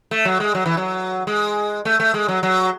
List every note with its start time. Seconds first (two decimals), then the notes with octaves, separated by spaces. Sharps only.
0.11 A3
0.25 F#3
0.40 G#3
0.55 F#3
0.66 E3
0.77 F#3
1.27 G#3
1.85 A3
2.00 A3
2.14 G#3
2.28 F#3
2.43 F#3